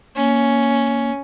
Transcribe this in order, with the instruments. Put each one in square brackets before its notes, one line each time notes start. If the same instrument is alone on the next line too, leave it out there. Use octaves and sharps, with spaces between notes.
[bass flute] A#3 [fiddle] C#4